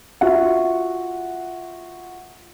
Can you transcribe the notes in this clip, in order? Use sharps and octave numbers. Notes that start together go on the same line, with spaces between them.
F4 F#4 E5 F#5